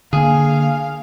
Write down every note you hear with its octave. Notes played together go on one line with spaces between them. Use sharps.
D3 A#3 G#4 F5